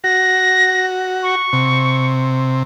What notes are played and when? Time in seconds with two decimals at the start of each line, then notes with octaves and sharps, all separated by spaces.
0.04 F#4 A#6
1.23 C#6
1.53 C3